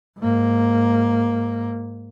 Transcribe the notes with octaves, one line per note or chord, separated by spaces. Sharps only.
G#2 A#3